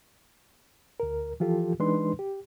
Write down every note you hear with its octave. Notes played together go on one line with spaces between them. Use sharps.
D2 A#4
E3 F3 F4 G4 A4
E3 G#3 D4 D#4 B4 C6
G4